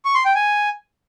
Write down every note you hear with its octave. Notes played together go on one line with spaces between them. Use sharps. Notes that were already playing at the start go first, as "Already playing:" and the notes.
C#6
C6
G5
G#5